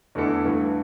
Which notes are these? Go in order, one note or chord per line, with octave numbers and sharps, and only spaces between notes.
E2 D3 A3 E4 A4
G2 E3 A3